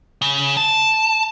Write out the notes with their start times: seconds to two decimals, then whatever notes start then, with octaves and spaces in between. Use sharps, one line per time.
0.22 C#3
0.57 A5